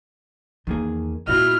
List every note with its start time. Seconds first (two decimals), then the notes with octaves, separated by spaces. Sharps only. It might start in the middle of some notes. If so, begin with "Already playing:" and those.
0.67 E2 D#3 A#3 G#4
1.27 A#2 E4 F#4 D#5 F6